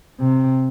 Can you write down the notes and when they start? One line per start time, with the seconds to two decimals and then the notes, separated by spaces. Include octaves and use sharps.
0.20 C3